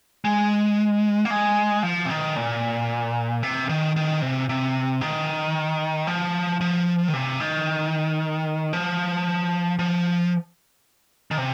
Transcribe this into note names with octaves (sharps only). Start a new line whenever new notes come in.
G#3
A#3
G#3
F3
C3
D#3
A#2
C3
D#3
D#3
C3
C3
D#3
F3
F3
D#3
C3
D#3
F3
F3
D#3
C3